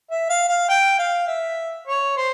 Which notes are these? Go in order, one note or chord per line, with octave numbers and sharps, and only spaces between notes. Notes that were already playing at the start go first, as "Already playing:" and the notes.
E5
F5
F5
G5
F5
E5
C#5
C5